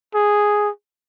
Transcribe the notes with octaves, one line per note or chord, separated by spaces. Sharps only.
G#4